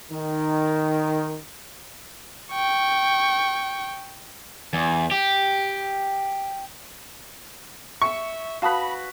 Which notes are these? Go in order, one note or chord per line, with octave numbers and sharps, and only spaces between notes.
D#3
G5 C#6
E2
G4
E5 C#6
F#4 B4 F5 A5 B5 D#6